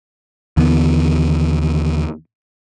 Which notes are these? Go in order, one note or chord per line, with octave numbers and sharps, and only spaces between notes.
D#2 D3 E3 B3